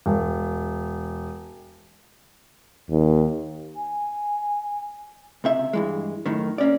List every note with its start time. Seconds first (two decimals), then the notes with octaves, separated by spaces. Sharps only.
0.06 E1
2.91 D#2
3.75 G#5
5.44 C#2 C3 E5
5.73 G2 E3 G#3
6.26 F#2 A2 D#3
6.58 A#3 C#4 D5